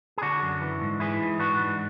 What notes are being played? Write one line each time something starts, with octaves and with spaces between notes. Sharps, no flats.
G#4
D3 D4 F#4
F#2
E3
G#2
E3 E4 G#4
G#2
E3 D4 F#4
G#2